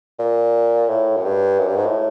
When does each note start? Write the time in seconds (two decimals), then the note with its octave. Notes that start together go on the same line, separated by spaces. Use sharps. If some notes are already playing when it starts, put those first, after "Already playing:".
0.19 A#2
0.89 A2
1.17 F#2
1.25 G2
1.59 F#2
1.68 G2
1.76 G#2
1.86 A2